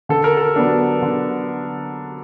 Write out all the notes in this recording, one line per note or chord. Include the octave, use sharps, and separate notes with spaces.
D3 A4
A#4
A4
F#3 B3 D4
D3